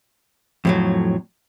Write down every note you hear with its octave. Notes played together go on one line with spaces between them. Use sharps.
F2 A2 F#3